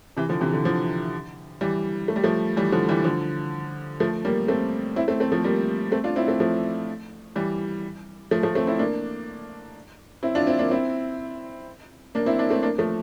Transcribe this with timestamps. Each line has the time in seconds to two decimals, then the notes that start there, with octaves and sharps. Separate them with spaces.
0.17 C3 E3
0.29 D3 F3
0.41 C3 E3
0.53 D3
0.65 D3 F3
1.61 E3 G3
2.08 A3
2.16 G3
2.24 F3 A3
2.57 E3 G3
2.72 D3 F3
2.89 E3 G3
3.04 D3 F3
4.00 F3 A3
4.25 G3 A#3
4.48 A3 C4
4.96 C4 E4
5.08 A3 C4
5.20 A3 C4
5.32 F3 A3
5.44 G3 A#3
5.92 A3 C4
6.04 D4 F4
6.16 C4 E4
6.28 A3 C4
6.40 F3 A3
7.36 E3 G3
8.31 F3 A3
8.43 F3 A3
8.55 A3 C4
8.67 C4 E4
8.79 A#3 D4
10.23 C4 E4
10.35 D4 F4
10.47 C4 E4
10.59 A#3 D4
10.71 C4 E4
12.15 A#3 D4
12.26 C4 E4
12.38 A#3 D4
12.50 A3 C4
12.62 A#3 D4
12.78 F3 A3